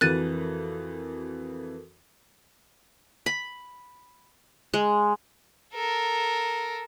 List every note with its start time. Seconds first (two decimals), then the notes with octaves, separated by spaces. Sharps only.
0.01 F2 E3 F#4 A4 A#4 F#6 A6 D#7
3.26 B5
4.74 G#3
5.73 A4 A#4